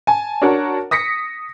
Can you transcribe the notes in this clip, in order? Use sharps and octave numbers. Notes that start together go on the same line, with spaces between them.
G#5 A5
D4 F#4 A#4 C#5 F#5 A5
D#6 A#6 B6 C#7